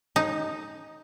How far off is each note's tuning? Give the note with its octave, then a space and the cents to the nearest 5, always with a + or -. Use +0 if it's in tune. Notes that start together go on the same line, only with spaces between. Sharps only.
D#4 +0